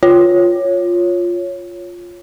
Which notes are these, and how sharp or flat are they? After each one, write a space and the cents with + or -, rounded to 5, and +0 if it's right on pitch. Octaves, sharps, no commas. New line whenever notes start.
F4 +5 C#5 +0